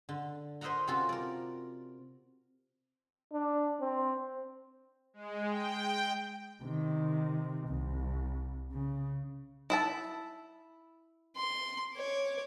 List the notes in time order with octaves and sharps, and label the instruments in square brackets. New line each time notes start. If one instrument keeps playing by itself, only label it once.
[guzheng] D3
A#4 C5 D#5 E5 F#5 A#5
C3 C4 C#4 F4 F#4 A4
A#4 D5
[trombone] D4
C4
[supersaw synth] G#3
G5
[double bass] C3 D#3
C2
C#3
[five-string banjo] E4 E5 A5
[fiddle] C6
C#5 D6